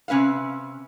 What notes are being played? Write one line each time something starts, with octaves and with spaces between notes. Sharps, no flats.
C3 C#4 B4 E5 F5